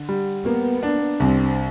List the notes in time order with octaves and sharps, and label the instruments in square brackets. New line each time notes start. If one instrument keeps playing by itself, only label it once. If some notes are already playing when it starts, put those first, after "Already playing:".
Already playing: [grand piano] D3
G3
[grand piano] A#3 [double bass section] B3
[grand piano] D4
[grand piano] C2 [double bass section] C4